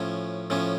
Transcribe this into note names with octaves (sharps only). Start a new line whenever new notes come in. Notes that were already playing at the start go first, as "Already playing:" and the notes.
Already playing: A2 F3 C#4
A2 F3 C#4